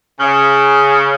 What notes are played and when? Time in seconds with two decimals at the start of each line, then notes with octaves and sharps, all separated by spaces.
0.20 C#3